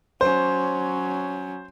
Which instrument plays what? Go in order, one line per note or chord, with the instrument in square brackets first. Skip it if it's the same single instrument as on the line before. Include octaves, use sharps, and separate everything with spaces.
[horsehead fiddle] F#3 C#4 [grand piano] C5